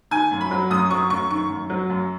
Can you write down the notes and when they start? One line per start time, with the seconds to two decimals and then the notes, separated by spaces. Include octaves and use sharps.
0.11 D#3 G#5
0.31 F#2
0.41 B5
0.51 F#3
0.70 F#2 D#6
0.90 F#3 C#6
1.10 F#2 C#6
1.30 D#3 C#6
1.50 F#2
1.70 F#3
1.90 F#2